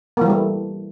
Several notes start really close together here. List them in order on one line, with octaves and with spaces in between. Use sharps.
A#3 E3 G3 A3